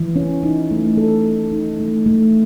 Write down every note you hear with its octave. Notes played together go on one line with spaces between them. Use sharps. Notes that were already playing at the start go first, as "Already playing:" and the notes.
Already playing: E3
C#4
D#4
A3
A4
A3
D#4
A3
A3